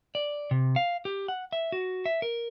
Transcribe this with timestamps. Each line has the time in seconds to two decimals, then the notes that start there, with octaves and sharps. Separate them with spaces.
0.15 D5
0.51 C3
0.76 F5
1.05 G4
1.28 F#5
1.52 E5
1.72 F#4
2.06 E5
2.22 A#4